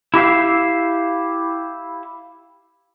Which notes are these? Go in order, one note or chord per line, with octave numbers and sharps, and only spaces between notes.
E4 G4 E5 F5